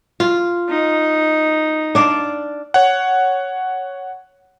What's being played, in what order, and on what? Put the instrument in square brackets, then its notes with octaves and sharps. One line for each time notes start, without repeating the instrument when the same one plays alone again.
[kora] F4
[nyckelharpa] D#4
[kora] D4 D5 F5
[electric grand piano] C#5 F#5